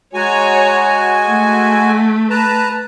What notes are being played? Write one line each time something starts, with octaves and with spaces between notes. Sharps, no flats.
G#3 F#4 C#5 G#5 A#5
A3
B4 A5 A#5